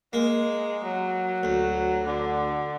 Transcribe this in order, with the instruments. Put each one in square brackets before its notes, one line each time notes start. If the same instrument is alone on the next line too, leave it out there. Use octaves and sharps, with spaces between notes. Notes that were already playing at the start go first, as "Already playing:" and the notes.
[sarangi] G#3 [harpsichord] A#3
[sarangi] F#3
[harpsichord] D2
[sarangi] D3